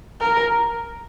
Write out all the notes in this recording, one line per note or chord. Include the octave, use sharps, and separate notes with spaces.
A#4